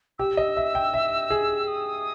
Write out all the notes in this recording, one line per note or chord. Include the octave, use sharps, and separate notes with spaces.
G4 E6
D#5
E5
G5
E5
G#4
D#6